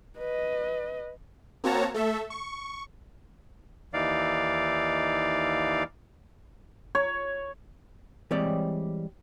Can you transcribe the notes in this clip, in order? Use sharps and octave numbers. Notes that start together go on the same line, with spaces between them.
B4 D#5
A#3 C4 F#4 C#5 A5 A#5
A3 A4 E5
C#6
D#2 E3 D#4 D5 F5
C#5
E3 G3 G#3 C4 C#5 D5